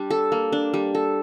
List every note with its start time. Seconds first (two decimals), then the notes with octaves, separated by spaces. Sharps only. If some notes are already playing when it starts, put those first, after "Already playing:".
Already playing: G3 D4
0.10 A4
0.32 A#3
0.52 D4
0.73 G3
0.95 A4